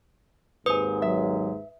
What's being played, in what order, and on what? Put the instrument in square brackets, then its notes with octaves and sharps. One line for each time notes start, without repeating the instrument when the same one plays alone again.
[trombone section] G#1 D#2 G#2 [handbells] B4 D#6 [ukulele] C5 G#5
[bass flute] F#3 [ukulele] E5